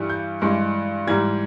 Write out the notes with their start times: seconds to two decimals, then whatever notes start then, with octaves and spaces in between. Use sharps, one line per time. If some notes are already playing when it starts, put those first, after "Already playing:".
Already playing: G2 E3 G3
0.10 G6
0.42 G2 E3 G#3
1.07 G#2 E3 G3 G#6